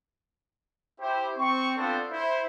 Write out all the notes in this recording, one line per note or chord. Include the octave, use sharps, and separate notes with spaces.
E4 G4 C5
C4 C#6
B3 C4 D4 F4 A4 C5
E4 C5